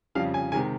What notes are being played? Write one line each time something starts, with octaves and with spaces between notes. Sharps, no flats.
F2 C#3 G3 F5
G#5
C3 D#3 G#3 G#5